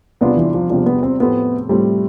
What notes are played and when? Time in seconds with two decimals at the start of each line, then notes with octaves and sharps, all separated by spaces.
0.21 E2 C3 G3 B3 D4 F4
0.37 E3
0.54 F3
0.70 E2 C3 F3 G3 D4 F4
0.86 B3
1.03 C4
1.20 A2 F3 A3 B3 C4 G4
1.69 A2 F3 G3 A3 C4 G4